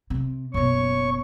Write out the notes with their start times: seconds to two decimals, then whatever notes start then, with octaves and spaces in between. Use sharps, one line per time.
0.10 C3
0.54 F#1 B2 C#5 C#6